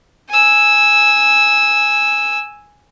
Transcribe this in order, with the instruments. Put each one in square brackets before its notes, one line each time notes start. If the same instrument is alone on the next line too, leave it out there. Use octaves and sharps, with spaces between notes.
[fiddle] G#5 E6